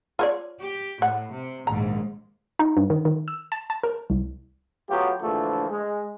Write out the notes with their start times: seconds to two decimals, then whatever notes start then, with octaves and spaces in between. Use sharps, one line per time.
0.19 F4 C#5 D5
0.61 G4
1.02 A2 F#5
1.33 C3
1.67 A#1 D#2 G#2 A#5
2.59 D#4
2.77 G2
2.90 D#3
3.05 D#3
3.28 E6
3.52 A5
3.70 A5
3.83 A#4
4.10 C2
4.90 F#3 A3 B3 F4 G4
5.21 A#1 D3 E3 F3 A3
5.70 G#3